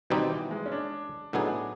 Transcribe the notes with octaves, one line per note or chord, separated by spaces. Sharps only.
B2 D#3 G3 C4 D#4 G4
E3
G#3
C#4
D4
A2 F#3 B3 D4 D#4 G#4